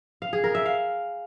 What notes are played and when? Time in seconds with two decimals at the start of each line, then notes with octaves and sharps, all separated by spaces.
0.22 F5
0.33 G#4
0.44 A#4
0.55 E5
0.66 F5